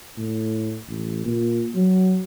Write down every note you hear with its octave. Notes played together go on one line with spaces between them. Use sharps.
A2
A1
A#2
F#3